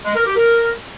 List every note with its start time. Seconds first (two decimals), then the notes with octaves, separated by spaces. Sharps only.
0.05 G#3
0.15 A#4
0.26 G4
0.36 A#4